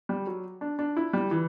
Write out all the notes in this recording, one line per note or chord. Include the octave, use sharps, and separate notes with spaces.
G3
F#3
D4
D4
E4
G3
E3